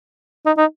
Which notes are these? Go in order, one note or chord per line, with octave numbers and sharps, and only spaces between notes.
D#4
D#4